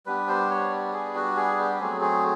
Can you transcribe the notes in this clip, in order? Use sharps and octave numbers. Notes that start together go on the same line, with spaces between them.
G3 B3 D4 B4
C5
C#5
G#4
F#4
G#4
G4
F#3 A3 C4 G#4
G#4